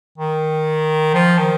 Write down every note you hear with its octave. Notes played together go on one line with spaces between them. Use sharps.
D#3
F3
D#3